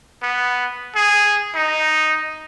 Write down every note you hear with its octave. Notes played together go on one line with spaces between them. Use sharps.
B3
G#4
D#4